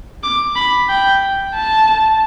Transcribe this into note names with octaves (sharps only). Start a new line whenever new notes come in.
D6
B5
G5
A5